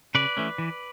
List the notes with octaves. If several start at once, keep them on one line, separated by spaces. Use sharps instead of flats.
C#3 B4 D5
E3 A3 C#4
E3